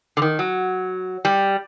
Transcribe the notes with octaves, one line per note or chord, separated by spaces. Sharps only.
D3
D#3
F#3
G3